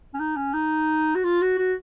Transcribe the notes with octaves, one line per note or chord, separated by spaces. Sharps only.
C#4
D#4
C#4
D#4
F#4
F4
F#4
F#4